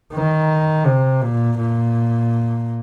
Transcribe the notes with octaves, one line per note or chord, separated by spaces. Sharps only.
D#3
C3
A#2
A#2